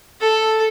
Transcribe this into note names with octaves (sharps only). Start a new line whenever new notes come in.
A4